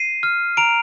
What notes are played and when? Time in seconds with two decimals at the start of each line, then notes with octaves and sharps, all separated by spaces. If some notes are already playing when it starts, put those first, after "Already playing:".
Already playing: C7 D#7
0.23 F6
0.57 A#5 D7 F7